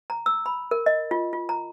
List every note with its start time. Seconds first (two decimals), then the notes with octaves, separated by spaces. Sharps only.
0.10 A#5
0.26 E6
0.46 B5
0.71 A#4
0.86 D#5
1.11 F4
1.33 F4
1.49 A#5